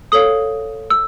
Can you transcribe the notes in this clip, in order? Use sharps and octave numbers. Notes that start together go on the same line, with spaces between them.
A4 C#5 F5 D#6
E6